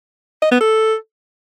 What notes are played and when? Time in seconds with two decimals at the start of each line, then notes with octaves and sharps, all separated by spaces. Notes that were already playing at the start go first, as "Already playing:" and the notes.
0.42 D#5
0.51 B3
0.61 A4